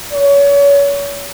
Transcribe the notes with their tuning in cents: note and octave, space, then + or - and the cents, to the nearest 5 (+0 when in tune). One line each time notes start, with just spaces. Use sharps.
C#5 +35